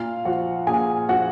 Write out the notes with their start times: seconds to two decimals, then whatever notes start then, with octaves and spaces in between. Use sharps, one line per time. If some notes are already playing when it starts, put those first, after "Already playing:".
Already playing: A#2 F4 F5
0.25 F3 F#4 F#5
0.67 A#2 G#4 G#5
1.09 F3 F#4 F#5